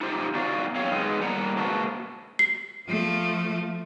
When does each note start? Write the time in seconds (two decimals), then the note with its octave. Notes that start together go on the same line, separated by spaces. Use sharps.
0.01 D#4 F4 G4 C5
0.35 B3 D#4 F#4 D5 F5
0.75 F#2 C4 C#5 F5
0.92 G#3 B3 D#4
1.21 A2 G3 A#3 F#5 A#5
1.56 G#2 A#3 F#4 G#4 B4 A5
2.39 C7
2.88 F3 A3